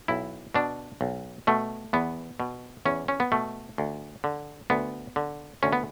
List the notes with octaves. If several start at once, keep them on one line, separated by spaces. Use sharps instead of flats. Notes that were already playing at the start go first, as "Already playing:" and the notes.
B1 E4
B2 D4
B1
B2 A3
E2 B3
B2
E2 C#4
C#4
B3
B2 A3
D2
D3
D2 B3
D3
D2 C#4
B3